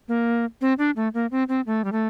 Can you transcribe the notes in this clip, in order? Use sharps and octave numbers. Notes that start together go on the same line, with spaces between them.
A#3
C4
D4
A3
A#3
C4
C4
A3
G3
A3